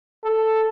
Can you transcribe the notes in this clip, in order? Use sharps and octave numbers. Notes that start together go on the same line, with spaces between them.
A4